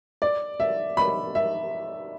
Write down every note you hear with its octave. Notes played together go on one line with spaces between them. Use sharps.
D5
E5
B5
E5